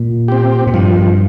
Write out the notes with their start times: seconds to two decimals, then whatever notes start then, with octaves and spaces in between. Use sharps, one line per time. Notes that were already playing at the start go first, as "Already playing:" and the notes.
Already playing: A#2
0.28 C4 G4
0.67 A#2
0.73 G2 F3